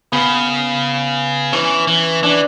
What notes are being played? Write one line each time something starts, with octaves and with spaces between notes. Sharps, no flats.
C#3 B3
E3 C#4
E3
E3 D4